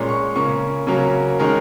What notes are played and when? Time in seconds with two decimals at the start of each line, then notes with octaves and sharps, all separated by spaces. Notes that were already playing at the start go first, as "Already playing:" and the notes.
Already playing: A#2 G#3 C#4 A#5
0.09 C#6
0.36 C#3 A#3 C#4 C#6
0.87 C#3 F#3 A#3 C#4
1.39 D#3 G#3 C#4 A#4